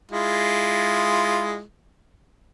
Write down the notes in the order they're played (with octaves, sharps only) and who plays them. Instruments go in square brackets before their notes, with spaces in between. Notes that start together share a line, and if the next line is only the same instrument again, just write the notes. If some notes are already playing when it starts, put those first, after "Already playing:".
[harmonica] G#3 E4 F4